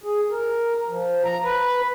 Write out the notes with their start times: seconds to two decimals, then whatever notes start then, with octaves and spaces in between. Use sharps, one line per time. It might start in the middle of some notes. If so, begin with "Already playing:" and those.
0.04 G#4
0.31 A#4
0.89 F3
1.25 A#5
1.44 B4